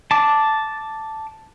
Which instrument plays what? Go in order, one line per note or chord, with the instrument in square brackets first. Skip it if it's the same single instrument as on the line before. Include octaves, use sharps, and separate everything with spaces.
[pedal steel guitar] A5 D6